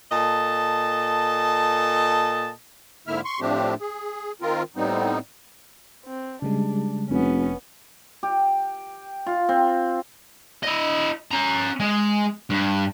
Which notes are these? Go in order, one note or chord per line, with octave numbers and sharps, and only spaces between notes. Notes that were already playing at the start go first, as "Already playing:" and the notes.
A#2 A4 D#5 A5
G#2 D3 A#3 E4 E5 F6
C6 C#6
A2 F3 A3 C4 D4 G4
G#4
D#3 C4 F4 A#4
A2 G3 B3 C4 D#4
C4
C#3 G3 G#3 D4
F1 B3 C#4
G4
F4
C4
E4 D#5
C#4 A#5
G#3
G2